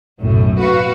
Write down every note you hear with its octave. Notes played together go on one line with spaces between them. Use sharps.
B1 F#2 A2
F#4 B4 F5